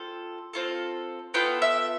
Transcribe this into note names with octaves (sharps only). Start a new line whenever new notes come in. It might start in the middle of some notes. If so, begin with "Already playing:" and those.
Already playing: C4 F4 A4
C4 F4 A4
B3 F4 A4 G5
E5